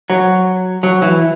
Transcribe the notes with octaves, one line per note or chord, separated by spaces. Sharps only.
F#3
F#3
E3